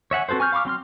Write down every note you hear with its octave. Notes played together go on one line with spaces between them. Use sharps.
C#5 E5 F#5 G#5
C4 F#4 A4 B4 C5
G#5 C#6 F6 G6
F5 B5 C#6 D6 F6
F#3 C4 C6 F6